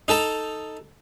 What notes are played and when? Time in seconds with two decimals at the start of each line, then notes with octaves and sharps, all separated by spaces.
0.08 D#4 A4 A5 A#5